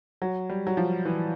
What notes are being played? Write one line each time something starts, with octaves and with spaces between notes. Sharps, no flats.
F#3
G3
F#3
F3
E3